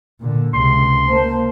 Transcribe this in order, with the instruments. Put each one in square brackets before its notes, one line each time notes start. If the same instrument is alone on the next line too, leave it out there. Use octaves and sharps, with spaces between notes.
[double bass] A#2 D3
[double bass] C#2 C3 [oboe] C6
[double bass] A#3 [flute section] C5 A5